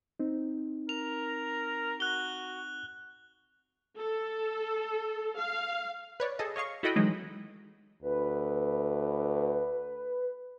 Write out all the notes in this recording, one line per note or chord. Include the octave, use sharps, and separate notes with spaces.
C4 D#4
A#4 F7
F#4 F#6 G7
A4
F5
B4 C#5 D5
G#4 A4 D#5
C#5 D#5 F5 C#6
E4 F#4 A4 D#5 G5 B5
E3 F#3 G#3 D#4
D2 B4